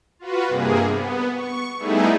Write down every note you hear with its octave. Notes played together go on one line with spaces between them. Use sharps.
F4 F#4 B4
G2 C3 A#3 G#4
B3
C#6
G3 A3 B3 D#4 E4 G#4